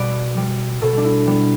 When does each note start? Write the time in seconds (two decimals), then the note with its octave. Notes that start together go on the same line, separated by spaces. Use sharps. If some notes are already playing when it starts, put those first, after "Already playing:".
Already playing: B2 G3 B4 D5
0.37 G3
0.82 B2 A4
0.97 D4
1.04 E4
1.27 G3 B3